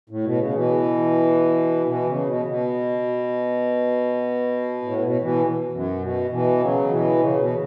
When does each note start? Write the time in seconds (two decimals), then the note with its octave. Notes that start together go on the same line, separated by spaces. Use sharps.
0.10 A2
0.24 B2
0.39 C#3
0.53 B2 E3
1.86 B2 E3
2.07 C#3
2.27 B2
2.46 B2
4.82 A2
5.02 B2
5.21 B2 E3
5.72 F#2
6.01 B2
6.31 B2 E3
6.59 C#3 F#3
6.89 B2 E3
7.19 C#3
7.39 B2